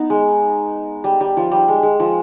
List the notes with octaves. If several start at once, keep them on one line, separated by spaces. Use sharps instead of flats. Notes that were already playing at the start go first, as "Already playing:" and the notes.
Already playing: B3 D#4
G#3
G3
G3
F3
G3
G#3
G#3
F3